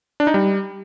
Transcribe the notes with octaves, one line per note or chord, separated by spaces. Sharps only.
D4
D#4
G3